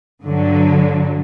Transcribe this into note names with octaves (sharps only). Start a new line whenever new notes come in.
G2 D3 F#3